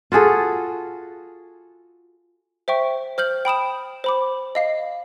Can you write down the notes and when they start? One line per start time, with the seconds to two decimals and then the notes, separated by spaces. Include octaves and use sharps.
0.12 F4 F#4 G#4 A4
2.68 C5 E5 G5 C#6
3.18 C5 F6 G6 F#7
3.45 G5 B5 D#6 E7
4.04 C5 B5 D6
4.55 D#5 F5 C7